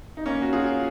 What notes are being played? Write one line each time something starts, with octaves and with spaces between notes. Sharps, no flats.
D#4
A#3 C#4
F#4
F4 G#4